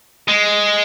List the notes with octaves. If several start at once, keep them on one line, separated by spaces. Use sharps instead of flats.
G#3